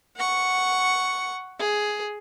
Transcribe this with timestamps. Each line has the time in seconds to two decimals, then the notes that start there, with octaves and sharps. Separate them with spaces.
0.17 F#5 C#6
1.59 G#4